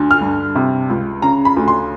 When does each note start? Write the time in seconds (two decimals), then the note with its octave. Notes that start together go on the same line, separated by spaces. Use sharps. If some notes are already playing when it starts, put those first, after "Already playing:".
Already playing: D2 D3
0.11 F6
0.21 G2
0.56 C3
0.89 C#2
1.22 C#3 A#5
1.45 B5
1.57 D2
1.68 C6